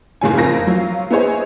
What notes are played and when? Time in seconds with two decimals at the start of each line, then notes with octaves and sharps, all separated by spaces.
0.21 F#1 A2 C#3 C#4 G#5
0.37 F2 F4 A#4 A#6
0.67 F#3 F4
1.11 B3 E4 G#4 C5 C#5 D#5